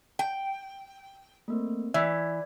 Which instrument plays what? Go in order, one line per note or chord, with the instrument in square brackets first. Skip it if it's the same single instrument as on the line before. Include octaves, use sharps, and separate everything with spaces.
[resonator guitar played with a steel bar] G5
[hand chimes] A3 A#3 C4
[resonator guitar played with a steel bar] E3 [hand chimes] D5 G#6 [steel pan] E5